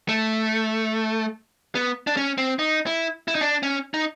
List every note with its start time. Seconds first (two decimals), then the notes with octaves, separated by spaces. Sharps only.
0.09 A3
1.75 B3
2.07 D4
2.17 C#4
2.38 C4
2.59 D#4
2.86 E4
3.28 E4
3.35 D#4
3.41 D4
3.63 C#4
3.94 D#4